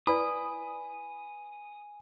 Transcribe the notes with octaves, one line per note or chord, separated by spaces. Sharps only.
E4 B4 D5 G#5 B5 D#6